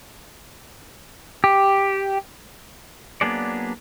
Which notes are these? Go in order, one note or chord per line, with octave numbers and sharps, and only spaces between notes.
G4
F#3 A#3 B3 D4 G#4 D5